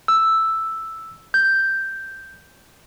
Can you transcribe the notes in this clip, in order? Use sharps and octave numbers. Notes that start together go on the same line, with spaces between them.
E6
G6